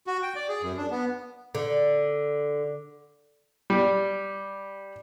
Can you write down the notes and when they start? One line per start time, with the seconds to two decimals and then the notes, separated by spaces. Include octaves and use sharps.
0.07 F#4
0.23 G5
0.36 D5
0.49 G#4
0.62 F#2
0.77 D4
0.91 B3
1.55 D3
3.70 G3